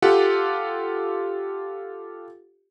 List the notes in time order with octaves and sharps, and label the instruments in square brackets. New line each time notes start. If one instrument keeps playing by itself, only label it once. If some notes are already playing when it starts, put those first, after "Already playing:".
[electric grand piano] F4 G4 A4 F#5